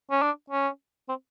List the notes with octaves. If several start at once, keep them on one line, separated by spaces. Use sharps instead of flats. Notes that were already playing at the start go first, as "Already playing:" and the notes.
C#4
D4
C#4
C4